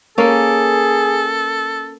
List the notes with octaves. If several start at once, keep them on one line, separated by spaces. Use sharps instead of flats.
A#3 C#4 G#4 A4